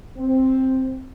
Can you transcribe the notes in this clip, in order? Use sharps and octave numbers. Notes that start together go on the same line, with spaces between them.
C4